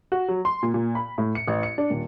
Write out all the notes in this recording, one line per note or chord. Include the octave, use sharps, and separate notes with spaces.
F#4
F#3
C6
A#2
A#2
B5
A2
C#7
A1
C#7
D4
D#1